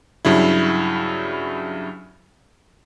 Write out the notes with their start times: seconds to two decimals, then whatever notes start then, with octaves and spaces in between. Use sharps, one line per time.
0.25 G2 C#3 F#3 E4